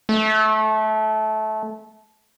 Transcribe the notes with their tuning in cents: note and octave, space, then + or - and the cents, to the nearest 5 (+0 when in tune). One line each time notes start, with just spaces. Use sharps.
A3 -20